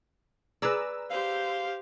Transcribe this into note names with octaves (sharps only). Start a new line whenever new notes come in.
G#4 B4 D5 A#5 E6
G4 C5 F5